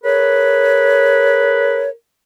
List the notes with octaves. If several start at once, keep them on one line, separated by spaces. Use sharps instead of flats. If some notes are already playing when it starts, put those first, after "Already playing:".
G#4 A#4 B4 C#5